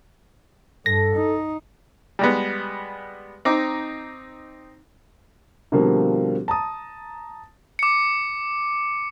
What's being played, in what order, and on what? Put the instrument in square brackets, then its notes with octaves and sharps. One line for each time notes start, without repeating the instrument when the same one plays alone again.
[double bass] G2 [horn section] A4 [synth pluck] A#6
[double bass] D#4
[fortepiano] G3 G#3 B3
C4 D#4 D6
[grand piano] B2 D3 F3 G3 A#3 C4
A5 A#5 D#6
[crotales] D6 C#7